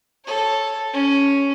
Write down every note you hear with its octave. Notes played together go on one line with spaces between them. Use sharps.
A4 C#5
C#4